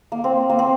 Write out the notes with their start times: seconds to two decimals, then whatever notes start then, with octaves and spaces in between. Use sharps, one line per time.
0.12 A#3
0.24 C4
0.50 A#3
0.59 C4